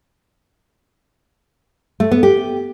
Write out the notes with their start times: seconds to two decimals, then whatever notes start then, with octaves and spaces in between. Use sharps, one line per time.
2.00 A3
2.11 B3
2.23 G4